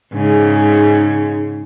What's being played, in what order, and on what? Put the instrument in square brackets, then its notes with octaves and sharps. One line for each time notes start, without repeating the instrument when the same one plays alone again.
[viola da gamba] G#2 C#3